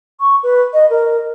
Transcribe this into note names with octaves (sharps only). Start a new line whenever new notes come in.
C#6
B4
D#5
A#4